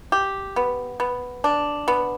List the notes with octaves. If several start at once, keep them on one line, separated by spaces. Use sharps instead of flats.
G4
B3
B3
D4
B3